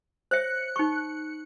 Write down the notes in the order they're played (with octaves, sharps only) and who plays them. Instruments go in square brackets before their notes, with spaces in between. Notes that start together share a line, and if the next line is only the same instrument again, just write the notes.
[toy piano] C5 C#5 E5 [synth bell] F#6 C#7
[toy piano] D#4 C#6